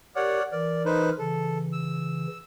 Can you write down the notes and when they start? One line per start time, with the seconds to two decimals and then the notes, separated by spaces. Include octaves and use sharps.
0.16 G4 A#4 C#5 D5 F#5
0.52 E3 A#4 D5
0.85 D#4 B4 C5
1.19 C#3 E3 A4
1.72 E6